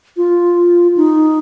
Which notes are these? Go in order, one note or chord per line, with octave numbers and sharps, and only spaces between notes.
F4
D#4